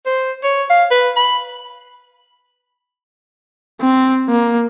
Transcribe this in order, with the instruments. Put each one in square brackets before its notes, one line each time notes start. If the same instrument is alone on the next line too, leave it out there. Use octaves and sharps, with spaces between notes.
[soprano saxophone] C5
C#5
F5
B4
B5
[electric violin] C4
A#3